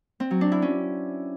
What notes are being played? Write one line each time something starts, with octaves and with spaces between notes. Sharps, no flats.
C4
F#3
D4
E4
C#4